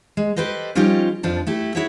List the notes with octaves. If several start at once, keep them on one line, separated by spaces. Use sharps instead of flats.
G#3
G4 A4 B4 C5 D#5
F3 G3 C#4 D#4 F4 G4
F2 F3 D4 A4
A3 E4 G4
E4 F#4 G#4 C#5 E5